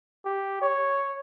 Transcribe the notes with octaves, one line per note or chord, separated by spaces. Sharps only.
G4
C#5